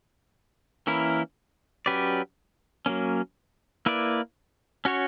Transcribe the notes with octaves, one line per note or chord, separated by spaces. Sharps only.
E3 A#3 C#4 E4 A#4
F#3 C#4 G4 B4 D5
F#3 A#3 C#4
A#3 E4 B4 D5
C#4 F#4 C#5